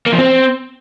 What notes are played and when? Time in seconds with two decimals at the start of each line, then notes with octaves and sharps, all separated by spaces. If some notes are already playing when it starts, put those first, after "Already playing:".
0.06 A#3
0.12 F3
0.18 C4